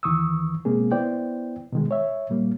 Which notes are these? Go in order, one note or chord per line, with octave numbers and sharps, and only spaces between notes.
D#2 D#3 E3 C#6 D#6 E6
B2 G#3 A#3 C4 G#4
B3 E4 C5 D5 G5
B2 D#3 G#3
C#5 E5
A#2 G3 A#3